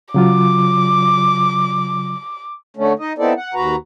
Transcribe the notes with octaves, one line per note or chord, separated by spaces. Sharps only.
C#3 F#3 F4 D6
D3 A3 C#4
D#4 D#5
B3 C4 D#4 E4 A4 D5
F#5
D#2 F#4 B4 A#5